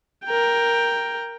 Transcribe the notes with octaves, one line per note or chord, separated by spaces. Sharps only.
A#4 G5